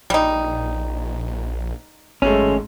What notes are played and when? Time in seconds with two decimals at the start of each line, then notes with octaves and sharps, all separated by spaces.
0.10 A#1 G3 D#4
2.22 G#1 F#2 G#3 A3 C#4